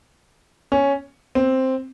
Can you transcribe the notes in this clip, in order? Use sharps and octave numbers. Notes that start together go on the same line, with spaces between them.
C#4
C4